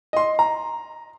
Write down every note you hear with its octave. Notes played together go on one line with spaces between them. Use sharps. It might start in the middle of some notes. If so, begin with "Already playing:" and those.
D#5 C6
A#5